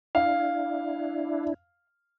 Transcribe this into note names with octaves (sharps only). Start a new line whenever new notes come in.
D4 E4 F5